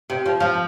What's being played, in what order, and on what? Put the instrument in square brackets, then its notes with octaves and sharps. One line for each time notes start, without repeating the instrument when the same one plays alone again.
[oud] C3
F3
F3